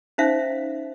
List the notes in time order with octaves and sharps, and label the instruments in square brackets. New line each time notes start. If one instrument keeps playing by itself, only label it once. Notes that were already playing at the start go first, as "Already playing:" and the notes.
[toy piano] C#4 D#4 C5 E5 F5